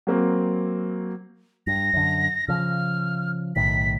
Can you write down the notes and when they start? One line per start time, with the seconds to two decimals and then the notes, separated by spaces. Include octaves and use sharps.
0.07 F#3 A#3 C4
1.67 G2 A#6
1.94 F#2 D3
2.48 C#3 F3 F6
3.56 B1 A2 D#3 B6